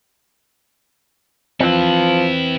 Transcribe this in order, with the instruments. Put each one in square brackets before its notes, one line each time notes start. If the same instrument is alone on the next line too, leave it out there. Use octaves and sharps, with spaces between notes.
[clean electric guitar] E3 C4 [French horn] F3 [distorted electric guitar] B3 E4